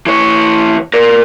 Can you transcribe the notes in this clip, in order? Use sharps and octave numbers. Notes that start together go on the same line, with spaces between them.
E3 C#5
A#4 D5